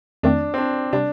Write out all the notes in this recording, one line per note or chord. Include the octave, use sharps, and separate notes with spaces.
F2 D#3 A3 C4 D4
C4
D4
C3 G3 D4